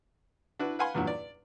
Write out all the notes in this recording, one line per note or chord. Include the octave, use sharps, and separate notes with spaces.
D4 E4 F#4 B4
B4 F5 F#5 G#5 B5 C6
E2 G2 A#2 F#3
D5